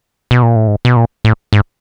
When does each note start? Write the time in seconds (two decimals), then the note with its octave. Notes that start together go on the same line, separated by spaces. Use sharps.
0.31 B2
0.43 A#2
0.56 A2
0.67 G#2
0.85 B2
0.97 A#2
1.25 A2
1.53 G#2